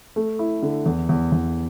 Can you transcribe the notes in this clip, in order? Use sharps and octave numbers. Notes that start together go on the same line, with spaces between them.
A3
E4
D3
E2
E2
E2